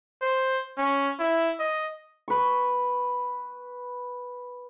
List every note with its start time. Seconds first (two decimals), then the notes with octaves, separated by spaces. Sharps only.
0.22 C5
0.78 C#4
1.20 E4
1.60 D#5
2.28 B4 C#6